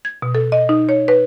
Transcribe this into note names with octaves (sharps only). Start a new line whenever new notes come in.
G#6
B2
A4
D#5
D#4
C#5
B4